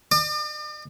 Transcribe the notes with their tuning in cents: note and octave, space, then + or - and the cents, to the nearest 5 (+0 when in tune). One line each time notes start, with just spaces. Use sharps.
D5 +45 D6 +40